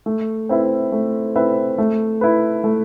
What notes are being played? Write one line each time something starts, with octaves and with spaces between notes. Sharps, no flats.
A3
C4 E4 B4 E5
A3
C4 E4 B4 E5
A3
E4 B4
A3